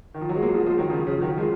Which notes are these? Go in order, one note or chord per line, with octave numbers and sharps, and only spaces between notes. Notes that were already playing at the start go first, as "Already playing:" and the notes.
D#3
F3
F#3
G#3
F#3 A#3
F3 G#3
F3 G#3
D#3 F#3
C#3 F3
C#3 F3
D#3 F#3
F3 G#3